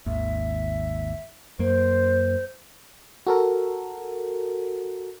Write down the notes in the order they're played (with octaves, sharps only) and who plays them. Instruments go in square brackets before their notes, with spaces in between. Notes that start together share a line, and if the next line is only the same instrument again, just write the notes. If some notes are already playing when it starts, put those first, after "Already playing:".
[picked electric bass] G#1 D#2 [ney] E5
[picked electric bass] F#2 A#3 [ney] C5
[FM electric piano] F#4 A4 A#4